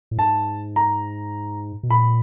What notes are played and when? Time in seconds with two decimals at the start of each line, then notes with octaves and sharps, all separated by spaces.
0.11 A2
0.18 G#2 A5
0.76 A#5
1.83 B2
1.89 A#2 B5